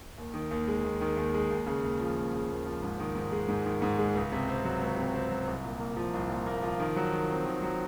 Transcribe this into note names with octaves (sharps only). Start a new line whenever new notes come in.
D#2
D#3
D#2
G#3
D#2
D#3
D#2
G#3
D#2
C#3
D#2
F3
D#2
C#3
D#2
F3
G#2
D#3
G#2
G#3
G#2
D#3
G#2
G#3
C#2
C3
C4
F#3
C#2
C3
C4
F#3
C2
A#2
A#3
F3
C2
A#2
A#3
F3
D#3
F#3
D#3
C4
D#3
F#3